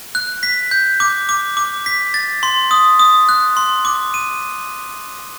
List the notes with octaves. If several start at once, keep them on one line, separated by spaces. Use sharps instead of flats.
F#6
B6
G6
D6
D6
D6
B6
A6
C6
D#6
D#6
F#6
C6
D6
D#7